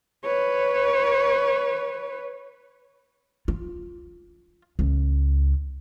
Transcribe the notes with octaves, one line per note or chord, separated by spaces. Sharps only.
B4 C#5
F4
C#2